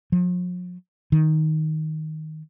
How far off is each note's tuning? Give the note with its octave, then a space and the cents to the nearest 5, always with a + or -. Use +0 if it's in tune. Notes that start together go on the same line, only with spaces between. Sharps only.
F3 +45
D#3 +5